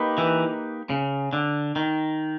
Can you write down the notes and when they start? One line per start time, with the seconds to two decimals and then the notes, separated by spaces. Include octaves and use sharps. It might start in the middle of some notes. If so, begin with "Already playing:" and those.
Already playing: A#3 D#4 G4 B4
0.18 E3
0.90 C#3
1.33 D3
1.76 D#3